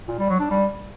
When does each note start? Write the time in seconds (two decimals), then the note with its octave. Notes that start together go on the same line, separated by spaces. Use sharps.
0.08 A#2
0.18 G3
0.29 F#3
0.40 D4
0.50 G3